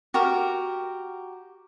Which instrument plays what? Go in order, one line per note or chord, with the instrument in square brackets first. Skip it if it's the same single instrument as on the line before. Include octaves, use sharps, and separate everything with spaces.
[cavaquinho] F#4 G4 A#4